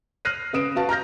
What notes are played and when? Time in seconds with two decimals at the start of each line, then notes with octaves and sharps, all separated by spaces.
0.25 F6 F#6 A#6 C7 D#7
0.53 C#3 B4 D#6 D7 E7
0.76 F#4 B4 F5 A5
0.89 A#5 F6 G6 A#6